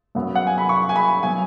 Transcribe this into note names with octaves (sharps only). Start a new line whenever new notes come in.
F#2 F#3 B3
F#5
G#5
B5
C#6
G#5
B5
F#3 B3 G#5